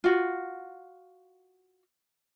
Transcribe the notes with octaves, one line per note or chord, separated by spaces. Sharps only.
F4 F#4